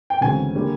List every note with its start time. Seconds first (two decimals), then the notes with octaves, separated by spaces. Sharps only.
0.10 G5
0.21 D2 C#3 E3 G#3 C4 G#5
0.55 D3 G3 A#3